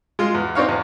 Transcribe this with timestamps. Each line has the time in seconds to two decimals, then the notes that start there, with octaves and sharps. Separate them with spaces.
0.19 G#3 F4
0.35 E2
0.55 C4 D4 D#4 C#5 F5
0.68 E2